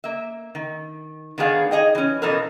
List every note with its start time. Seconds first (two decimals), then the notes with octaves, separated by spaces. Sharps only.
0.04 A#3 E5
0.55 D#3
1.38 D#3 A3 B3 D4 G#4 F5
1.71 D#4 G#4 D#5 G5
1.95 E3 C#4
2.22 B2 E3 F3 D#4 A4 A#4